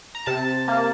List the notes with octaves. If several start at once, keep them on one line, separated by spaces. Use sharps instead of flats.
A#5
C3 A5
A#3